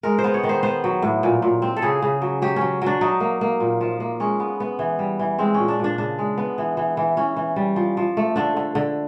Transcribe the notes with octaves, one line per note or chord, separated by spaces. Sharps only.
G#3 A#4
C5
B3
C#5
D#3
C5
B3 C5
F#3
A2
A#2
A#2
C4
A4
C#3 G#4
C#3
F#3
F#3 G4
F#3 C#4
F#3 D4
F#3 D#4
A#3
A#3
A#2
F3
A#3
G#3 C#4
B3
B3
E3
G3
E3
G#3 C4
A#2 C#4
D4
A#2 D4
C#3 D4
G#3
B3
E3
E3
E3
E3 C#4
E3
G3
F3
F3
A3
D3 D4
D3
D3